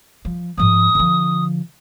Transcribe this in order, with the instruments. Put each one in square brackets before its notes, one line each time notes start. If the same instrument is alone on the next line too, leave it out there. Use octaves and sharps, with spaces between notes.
[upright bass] F3
[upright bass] G#2 F3 [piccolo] D#6
[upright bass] D3 F3